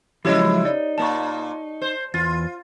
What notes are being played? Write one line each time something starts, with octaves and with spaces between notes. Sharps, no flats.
C#3 F3 F#3 G#3 E4 G4 C#5 D#5
D#4 D5
A#2 A#3 A5 C#6
C5
E2 F4 A6